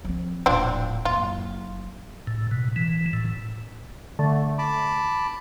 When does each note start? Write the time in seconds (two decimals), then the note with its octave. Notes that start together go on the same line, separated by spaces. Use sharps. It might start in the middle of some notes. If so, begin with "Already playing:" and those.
0.04 F3 C4
0.46 D#1 A2 F3 C4 D4
1.05 D#2 D#3 F4
1.17 F#1
2.27 A2
2.51 B2
2.76 E3
3.13 A2
4.19 D3 A3
4.58 A5 B5 D6